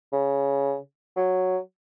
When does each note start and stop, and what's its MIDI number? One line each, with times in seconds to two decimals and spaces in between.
0.12 0.77 49
1.17 1.58 54